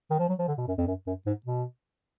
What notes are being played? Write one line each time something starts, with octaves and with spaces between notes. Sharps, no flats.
D#3
F3
F#3
F3
D3
B2
F#2
F2
F#2
F#2
G#2
B2